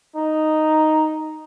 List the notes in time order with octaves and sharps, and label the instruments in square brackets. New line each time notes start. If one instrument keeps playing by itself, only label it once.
[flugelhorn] D#4